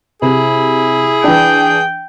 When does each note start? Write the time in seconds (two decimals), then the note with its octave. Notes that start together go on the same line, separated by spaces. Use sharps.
0.22 C3 E4 G#4
1.24 E3 D4 G5